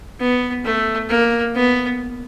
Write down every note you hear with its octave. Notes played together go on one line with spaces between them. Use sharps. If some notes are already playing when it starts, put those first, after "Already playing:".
B3
A3
A#3
B3